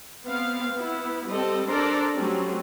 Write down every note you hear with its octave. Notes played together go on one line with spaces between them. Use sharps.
B3 C4 F5
B3 E4
G3 C4 A4 D#5
D4 A4 A#4 C5 D5 A#5
F#3 G3 A3 C4 C#4 G4